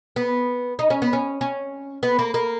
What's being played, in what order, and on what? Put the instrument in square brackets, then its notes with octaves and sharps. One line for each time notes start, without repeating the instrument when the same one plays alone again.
[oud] B3
D#4
C#4
B3
C#4
C#4
B3
A#3
A#3